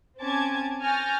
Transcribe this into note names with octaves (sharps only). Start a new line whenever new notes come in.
C4 C#4 A5 D6 G#6
G#5 C#6 F6 G6 A6 A#6